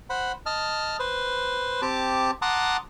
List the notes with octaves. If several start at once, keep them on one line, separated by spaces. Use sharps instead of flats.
C5 F#5 B5
D#5 A5 F6
B4 C5
C4 G4 A5 D6
F#5 A5 A#5 C6 D6 D#6